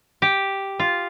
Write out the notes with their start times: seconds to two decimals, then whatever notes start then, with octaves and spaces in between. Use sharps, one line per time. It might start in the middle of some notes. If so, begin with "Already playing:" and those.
0.22 G4
0.79 F4